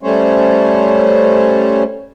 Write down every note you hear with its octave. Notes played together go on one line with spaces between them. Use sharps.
G3 A3 C#4 C5 C#5